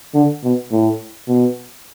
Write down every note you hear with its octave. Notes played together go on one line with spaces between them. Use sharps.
D3
B2
A2
B2